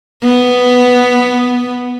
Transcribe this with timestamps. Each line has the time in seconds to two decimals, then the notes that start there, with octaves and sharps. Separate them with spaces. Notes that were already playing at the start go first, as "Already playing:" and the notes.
0.23 B3